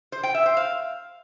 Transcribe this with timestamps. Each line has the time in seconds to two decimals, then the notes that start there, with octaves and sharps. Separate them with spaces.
0.12 C5
0.23 G5
0.35 E5
0.46 C5
0.57 F5